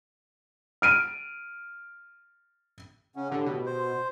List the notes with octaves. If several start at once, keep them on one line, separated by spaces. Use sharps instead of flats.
F6 D7 D#7
C#3 C#4 F#5
A2 D3 G4
B2
C5
C6